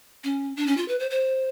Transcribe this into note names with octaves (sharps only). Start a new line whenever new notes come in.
C#4
D4
C#4
F4
B4
C5
C5